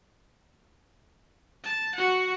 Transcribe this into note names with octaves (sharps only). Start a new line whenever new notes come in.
A5
F#4 F#5